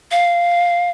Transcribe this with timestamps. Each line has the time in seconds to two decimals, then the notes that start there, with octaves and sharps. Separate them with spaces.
0.11 F5